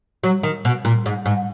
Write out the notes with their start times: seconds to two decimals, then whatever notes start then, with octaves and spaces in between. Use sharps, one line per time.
0.24 F#3
0.43 D#3
0.65 B2
0.85 A#2
1.06 G#2
1.26 G#2